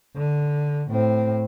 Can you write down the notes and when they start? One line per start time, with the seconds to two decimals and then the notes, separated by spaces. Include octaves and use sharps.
0.16 D3
0.91 A2 C4